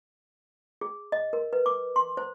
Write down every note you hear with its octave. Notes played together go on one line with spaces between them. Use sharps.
G#4
D#5
A#4
B4
D6
C6
C5